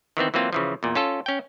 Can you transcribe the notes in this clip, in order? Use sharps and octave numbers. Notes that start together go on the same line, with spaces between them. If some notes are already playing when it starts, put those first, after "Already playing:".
D#3 E3 B3 C4
E3 F#3 A#3 C4 F4
C#3 E3 F3
E2 A#2
C#4 F4 A4
C#4 G5